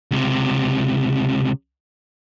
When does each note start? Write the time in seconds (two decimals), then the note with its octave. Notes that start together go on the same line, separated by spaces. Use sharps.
0.11 C#2 C3